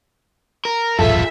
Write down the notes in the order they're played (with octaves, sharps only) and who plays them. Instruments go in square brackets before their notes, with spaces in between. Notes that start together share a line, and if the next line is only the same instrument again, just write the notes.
[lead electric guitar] A#4
[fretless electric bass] D#1 A1 F#2 [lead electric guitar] F4 G#4 [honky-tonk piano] A4 [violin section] E5